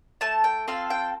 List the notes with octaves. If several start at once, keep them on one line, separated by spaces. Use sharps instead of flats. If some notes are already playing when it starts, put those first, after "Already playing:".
A3 A5
G5
C4 F4 A4 F5
G5